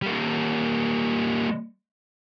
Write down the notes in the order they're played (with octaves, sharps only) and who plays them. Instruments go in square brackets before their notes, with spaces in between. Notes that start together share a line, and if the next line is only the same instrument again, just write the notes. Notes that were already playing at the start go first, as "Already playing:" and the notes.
[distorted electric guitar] G3 A#3